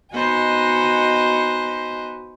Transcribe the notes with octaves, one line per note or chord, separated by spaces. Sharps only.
B3 D#4 F#4 C5 D#5 G#5